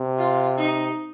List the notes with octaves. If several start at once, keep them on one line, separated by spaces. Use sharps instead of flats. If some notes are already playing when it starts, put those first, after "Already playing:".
Already playing: C3
F4
D#4